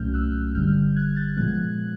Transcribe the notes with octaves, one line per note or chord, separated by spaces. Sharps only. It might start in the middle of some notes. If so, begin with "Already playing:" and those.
Already playing: C2 A#2 F#3 A3 C#4 F6 G6
E6 F#6
G1 G2 D3 G3 F6 G6
F#6 G#6
G6 A6
A#2 F3 G#3 B3 F#6 G#6